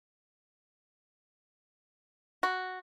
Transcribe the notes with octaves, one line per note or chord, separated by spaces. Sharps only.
F#4